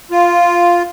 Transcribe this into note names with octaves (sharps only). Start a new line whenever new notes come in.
F4